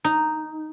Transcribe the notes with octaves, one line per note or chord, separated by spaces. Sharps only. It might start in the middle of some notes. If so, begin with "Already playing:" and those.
D#4